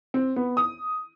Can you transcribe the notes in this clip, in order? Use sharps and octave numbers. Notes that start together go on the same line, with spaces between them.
C4
B3
D#6